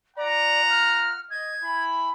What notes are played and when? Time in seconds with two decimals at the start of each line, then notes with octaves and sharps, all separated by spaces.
0.17 F4 D5 F#5 A#5
0.70 F6
1.30 D#5 G#6
1.63 E4 G#5 B5